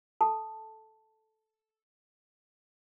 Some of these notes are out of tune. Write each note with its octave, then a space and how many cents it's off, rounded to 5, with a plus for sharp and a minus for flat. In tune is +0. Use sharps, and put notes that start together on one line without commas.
A4 -10 A5 +0